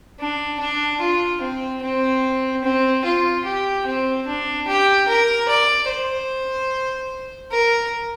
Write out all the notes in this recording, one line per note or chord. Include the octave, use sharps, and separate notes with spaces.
D4
D4
F4
C4
C4
C4
F4
G4
C4
D4
G4
A#4
D5
C5
A#4